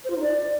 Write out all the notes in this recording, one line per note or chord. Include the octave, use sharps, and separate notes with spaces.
C5
F4
D#4
D5